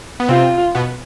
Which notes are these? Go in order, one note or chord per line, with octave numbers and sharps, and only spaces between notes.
B3
C3 C4 F4
B2 B3